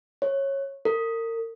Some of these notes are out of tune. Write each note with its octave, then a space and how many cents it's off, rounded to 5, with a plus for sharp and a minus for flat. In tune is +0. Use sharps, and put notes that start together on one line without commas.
C#5 -15
A#4 -35